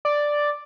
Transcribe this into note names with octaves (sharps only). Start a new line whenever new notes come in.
D5